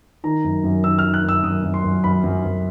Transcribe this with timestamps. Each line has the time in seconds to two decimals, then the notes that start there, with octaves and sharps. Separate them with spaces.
0.24 D#3 A#5
0.44 F#2
0.64 F#2
0.84 D#3 E6
0.99 F6
1.04 D#3
1.14 F#6
1.23 F#2
1.29 E6
1.43 F#2 D#6
1.64 F#2
1.74 C6
1.84 F#2
2.04 F#2 B5
2.24 F#2
2.44 F#2